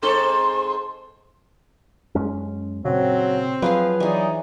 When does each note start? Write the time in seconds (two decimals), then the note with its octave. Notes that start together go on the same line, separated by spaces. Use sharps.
0.02 G#2 C4 A4 C6
2.15 F#2 G#3 C#4
2.85 A#2 C#3 F#3 C4
3.62 F3 F#3 G#4 B4 F5
4.00 E3 D#4 G#4 C#5 D5